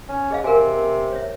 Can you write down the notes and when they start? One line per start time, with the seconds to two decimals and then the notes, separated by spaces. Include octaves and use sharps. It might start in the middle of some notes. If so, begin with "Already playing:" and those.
0.09 C#4
0.31 G#4 D#5 F5
0.44 C3 A#4 G#5
1.13 C#5 E5